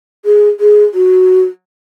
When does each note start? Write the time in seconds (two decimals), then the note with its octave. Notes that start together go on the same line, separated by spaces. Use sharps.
0.25 G#4
0.60 G#4
0.94 F#4